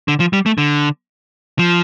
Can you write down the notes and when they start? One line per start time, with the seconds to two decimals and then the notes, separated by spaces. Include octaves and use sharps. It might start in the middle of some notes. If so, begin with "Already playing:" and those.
0.08 D3
0.20 F3
0.33 G3
0.46 A3
0.58 D3
1.59 F3